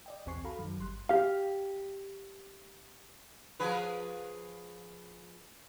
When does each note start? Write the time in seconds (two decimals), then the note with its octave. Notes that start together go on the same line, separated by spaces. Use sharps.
0.06 D5 D#5 G5
0.26 B1 E2 C4 G#5 C#6 C7
0.44 F#4 A4 F5 A#5 B5
0.59 F#2 D#3 F#3
0.78 G1 G3 C6 F#6
1.09 G4 F5
3.60 F3 G#4 B4